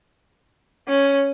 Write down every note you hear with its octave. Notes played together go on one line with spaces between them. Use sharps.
C#4